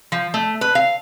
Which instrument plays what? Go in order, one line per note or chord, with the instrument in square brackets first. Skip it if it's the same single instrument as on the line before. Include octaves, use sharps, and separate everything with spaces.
[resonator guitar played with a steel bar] F3
A3
B4
F5